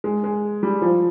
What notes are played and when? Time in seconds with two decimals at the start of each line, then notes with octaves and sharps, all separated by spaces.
0.04 G#3
0.24 G#3
0.63 G3
0.82 F3